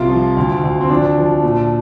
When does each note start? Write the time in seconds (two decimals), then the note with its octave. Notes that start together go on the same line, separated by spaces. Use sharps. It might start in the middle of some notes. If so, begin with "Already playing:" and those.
Already playing: C2 C3 F4
0.10 F3
0.37 D2
0.64 D2
0.81 C4
0.90 F3 D4
1.17 F3
1.43 A#2